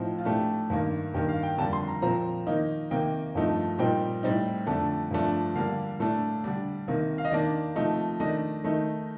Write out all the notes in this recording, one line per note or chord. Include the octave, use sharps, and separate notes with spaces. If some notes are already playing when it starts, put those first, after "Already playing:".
Already playing: A2 F3 C4 D#4
F4
A2 A3 D4 G4
G2 D#3 A#3
G2 D#3 A#3 G4
F5
G5
F2 D3 G3 A#3 A5
C6
A#5
A#2 F3 C4 A#5
D#3 A#3 D#4
C3 D#3 A#3 G5
G2 F3 A3 D#4
A#2 G3 C4 D#4 G5
A2 G3 C4 D#4
F2 D3 A3 D4
G2 F3 A3 D4
D3 G3 A#3 D4 F5
A2 A3 D4
D3 G3 D4
C3 D#3 A#3
F5
D#5
D#3 A#3 D4 D5
C3 F3 A3 D#4
D#3 A3 D4 D#5
D#3 A3 D#4